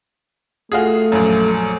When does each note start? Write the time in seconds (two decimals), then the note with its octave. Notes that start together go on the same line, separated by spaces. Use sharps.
0.72 A3 F4 F#4 G#4
1.12 A#1 F#2